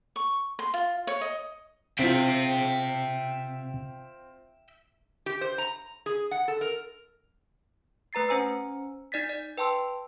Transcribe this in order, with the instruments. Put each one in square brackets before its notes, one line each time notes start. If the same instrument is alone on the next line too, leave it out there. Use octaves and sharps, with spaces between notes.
[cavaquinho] C#6
C6
F4
C#5
D#5
[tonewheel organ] C3 [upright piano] C4 F4 [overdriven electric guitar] E5 G5
[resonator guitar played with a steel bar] G4
C5
A#5
G#4
F#5
A4
A#4
[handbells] A3 B4 A#5 A6 C7
C#4 C5 G#5 A#5 E6
D#4 D5 A6 B6
D5
B4 G5 A5 C6 E6